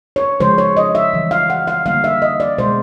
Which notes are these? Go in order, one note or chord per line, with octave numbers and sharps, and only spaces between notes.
C#5
C#3 F3 G#3 C5
C#5
D#5
E5
C#3 E3 G3
F5
F#5
F5
D3 G3 A#3 F5
E5
D#5
D5
B2 G#3 C5